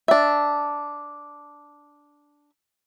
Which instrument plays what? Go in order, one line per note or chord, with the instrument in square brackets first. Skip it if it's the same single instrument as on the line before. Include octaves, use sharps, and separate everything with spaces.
[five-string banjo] D4 E5